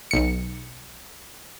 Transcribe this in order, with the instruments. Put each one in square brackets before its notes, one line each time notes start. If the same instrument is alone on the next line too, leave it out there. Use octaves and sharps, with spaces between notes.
[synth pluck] B1 C#7